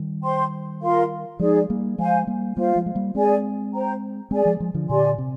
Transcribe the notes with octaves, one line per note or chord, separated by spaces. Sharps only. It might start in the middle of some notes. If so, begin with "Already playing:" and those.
Already playing: D#3 G3
C5 G5 C6
F4 A#4 F5 C6
F3 G#3 D#4 G#4 D5
G3 A#3
F3 G#3 C5 F5 G#5
G3 A#3
G3 A#3 F4 C5 F5
F3 G#3
G#3
G3 A#3
G#3 C4 G#4 D5 G#5
C5 G5 A#5
G#3 C4 G#4 D5 G#5
F3 G#3
F3 G#3
D3 F3
A#2 D3 G4 D5 G#5 C6
C3